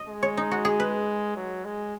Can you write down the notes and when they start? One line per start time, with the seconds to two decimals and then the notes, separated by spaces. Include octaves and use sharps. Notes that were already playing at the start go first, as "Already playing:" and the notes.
Already playing: D#5
0.08 G#3
0.23 C#5
0.37 D#4
0.51 F#4
0.65 G#4
0.80 B4
1.36 F#3
1.65 G#3